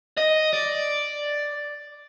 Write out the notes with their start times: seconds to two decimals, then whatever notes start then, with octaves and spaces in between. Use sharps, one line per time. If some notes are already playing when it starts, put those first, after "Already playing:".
0.17 D#5
0.53 D5